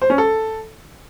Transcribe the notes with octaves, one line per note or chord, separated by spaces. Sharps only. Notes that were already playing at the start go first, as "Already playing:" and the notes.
C5
C#4
A4